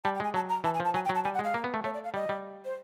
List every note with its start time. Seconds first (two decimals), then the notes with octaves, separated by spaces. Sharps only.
0.04 G3 A5
0.15 G5
0.20 G#3 G#5
0.34 F#3 A5
0.49 A#5
0.64 E3 A5
0.74 G#5
0.80 F3
0.85 A5
0.94 F#3 G#5
1.05 G5
1.09 F#3
1.15 A5
1.24 G3 G#5
1.35 F#5
1.39 G#3
1.44 F5
1.54 A#3
1.64 B3
1.74 A3
1.84 A3 C#5
1.94 D5
2.04 F5
2.14 G3 D#5
2.29 G3
2.65 C5